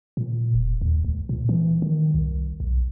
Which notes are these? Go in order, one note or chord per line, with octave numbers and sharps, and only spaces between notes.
A#2
E1
D#2
C#2
A#2
E3
D#3
C2
B1